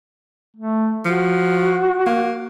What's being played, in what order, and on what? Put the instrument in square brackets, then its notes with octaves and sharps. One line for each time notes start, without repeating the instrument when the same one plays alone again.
[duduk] A3
[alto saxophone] F3 [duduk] F#4
[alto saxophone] A#3